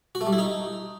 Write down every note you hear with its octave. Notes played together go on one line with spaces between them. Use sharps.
F#4
A3
G3
E4
D#4